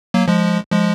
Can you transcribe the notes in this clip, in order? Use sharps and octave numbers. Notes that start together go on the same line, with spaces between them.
F#3 A#3
F3 G#3
F3 G#3